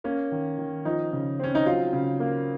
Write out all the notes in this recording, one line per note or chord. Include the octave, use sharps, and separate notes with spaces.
A#3 C#4
D#3
D#3
F3 D#4
C#3
C4 C#4
D#4
F#3 F4
C#3
A#3